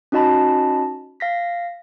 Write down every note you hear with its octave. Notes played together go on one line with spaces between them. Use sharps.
C#4 D#4 F#4 D#5 A5 B5
F5 A#6 B6